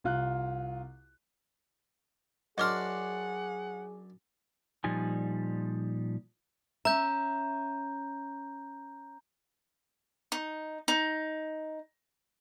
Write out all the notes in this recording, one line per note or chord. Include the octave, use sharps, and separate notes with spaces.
C2 F4 F#6
F#2 D4 G#4 D#5 F#5 C6 D6 F6
A#2 F3 G3 D#4 G#5
C#4 E5 A#5 G6
D#4
D#4